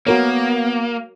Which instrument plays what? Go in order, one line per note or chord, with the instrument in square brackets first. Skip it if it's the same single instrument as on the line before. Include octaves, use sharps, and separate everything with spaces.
[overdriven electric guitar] A#3 [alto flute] B3 [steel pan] F#4 A#4 C#5